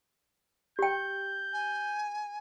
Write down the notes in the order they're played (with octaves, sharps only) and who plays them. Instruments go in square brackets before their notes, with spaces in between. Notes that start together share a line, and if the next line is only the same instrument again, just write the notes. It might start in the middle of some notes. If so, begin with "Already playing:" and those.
[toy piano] G4 G5 [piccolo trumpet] G6
[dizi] G#5